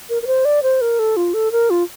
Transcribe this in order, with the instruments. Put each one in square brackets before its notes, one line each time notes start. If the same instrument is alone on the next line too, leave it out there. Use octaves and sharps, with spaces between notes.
[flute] A#4
A#4
C5
D5
C5
A#4
A4
F4
A4
A#4
F4